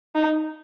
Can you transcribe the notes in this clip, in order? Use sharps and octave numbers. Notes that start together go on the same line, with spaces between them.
D#4